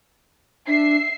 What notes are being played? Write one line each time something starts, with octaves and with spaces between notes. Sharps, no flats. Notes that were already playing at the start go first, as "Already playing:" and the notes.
D4 E5 C7